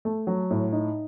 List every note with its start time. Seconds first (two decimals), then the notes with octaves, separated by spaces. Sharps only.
0.05 A3
0.27 F#3
0.51 A2
0.72 D#4